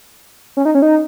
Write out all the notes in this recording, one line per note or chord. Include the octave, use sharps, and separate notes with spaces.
C#4
D#4
C#4
D#4